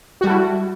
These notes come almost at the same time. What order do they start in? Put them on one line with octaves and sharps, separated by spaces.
F#4 G3 A4 E4